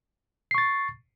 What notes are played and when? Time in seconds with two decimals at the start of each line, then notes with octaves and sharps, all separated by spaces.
0.51 C7
0.55 C#6
0.58 A6